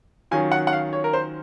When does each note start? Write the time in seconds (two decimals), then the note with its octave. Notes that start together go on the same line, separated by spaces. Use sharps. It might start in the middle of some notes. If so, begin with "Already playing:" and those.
0.31 D#3 F#3 C#4 F4 G#5
0.51 F#5
0.67 F#5
0.73 F5
0.93 C#5
1.04 A#4
1.13 C5